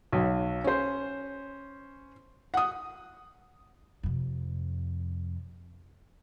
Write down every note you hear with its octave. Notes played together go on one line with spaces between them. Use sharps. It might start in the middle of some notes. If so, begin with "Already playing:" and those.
B1 F#3
C#4 C5
F#5 D#6
F2 C3